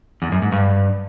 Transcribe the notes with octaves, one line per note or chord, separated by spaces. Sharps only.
E2
F#2
G#2
G2